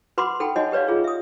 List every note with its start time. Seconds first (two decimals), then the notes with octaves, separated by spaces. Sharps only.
0.18 F#4 B4 F#5 B5 C6 D6
0.40 D#4 A4 F#5 G5 B5
0.56 D#4 F#4 C#5 D#5 F#5 G#5
0.72 G4 B4 C#5 D5 F5
0.88 F4 G#4 C#5
1.04 E5 D#6